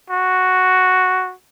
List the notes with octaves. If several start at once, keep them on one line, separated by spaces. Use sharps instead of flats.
F#4